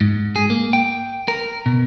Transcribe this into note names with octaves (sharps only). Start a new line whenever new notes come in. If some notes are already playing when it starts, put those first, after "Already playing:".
G#2
G#4
A#3
G5
A#4
B2